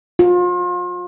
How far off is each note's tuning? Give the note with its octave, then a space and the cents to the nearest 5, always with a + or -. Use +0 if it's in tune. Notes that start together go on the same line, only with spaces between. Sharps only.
F4 +35